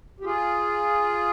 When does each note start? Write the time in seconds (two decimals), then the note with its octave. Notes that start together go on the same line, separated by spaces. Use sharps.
0.20 G4
0.24 F4 G#4